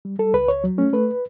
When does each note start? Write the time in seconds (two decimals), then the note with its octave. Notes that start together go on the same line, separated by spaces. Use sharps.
0.05 G3
0.19 G3 A4
0.34 C#2 B4
0.48 C#2 C#5
0.64 F#3
0.78 A3 C#4
0.93 A3 B4